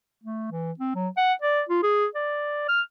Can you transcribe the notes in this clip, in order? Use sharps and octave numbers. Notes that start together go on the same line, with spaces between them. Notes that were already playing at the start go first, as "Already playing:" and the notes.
A3
E3
C4
F#3
F#5
D5
F4
G#4
D5
F6